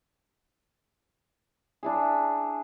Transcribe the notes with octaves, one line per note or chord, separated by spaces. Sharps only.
D4 E4 G#4